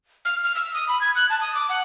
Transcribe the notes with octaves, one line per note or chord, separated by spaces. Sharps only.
F6
F6
E6
D#6
B5
G#6
F#6
A5
D#6
D6
F#5